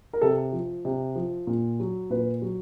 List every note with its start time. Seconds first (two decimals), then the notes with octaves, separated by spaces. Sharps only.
0.13 A#4
0.22 C3 A4
0.53 F3
0.85 C3
1.16 F3
1.47 A#2
1.80 F#3
2.10 A#2 B4
2.42 F#3